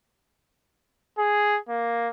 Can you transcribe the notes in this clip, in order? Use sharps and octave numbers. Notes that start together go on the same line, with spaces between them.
G#4
A#3